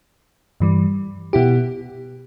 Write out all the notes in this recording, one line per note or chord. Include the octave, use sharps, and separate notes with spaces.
G2 E3 G3
B2 B3 E4 G4